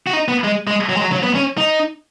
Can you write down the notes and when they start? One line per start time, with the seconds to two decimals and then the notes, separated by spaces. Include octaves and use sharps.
0.07 F#4
0.13 D#4
0.28 B3
0.44 G#3
0.67 G#3
0.89 F#3
0.97 G#3
1.01 F#3
1.12 F#3
1.23 B3
1.35 C#4
1.58 D#4